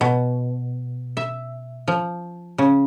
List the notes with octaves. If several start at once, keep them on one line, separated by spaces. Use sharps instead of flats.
B2
E5
F3
C#3